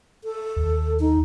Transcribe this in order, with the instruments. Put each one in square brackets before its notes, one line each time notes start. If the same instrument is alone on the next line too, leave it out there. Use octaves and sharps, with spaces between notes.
[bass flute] A4
[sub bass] D#2
[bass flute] D#4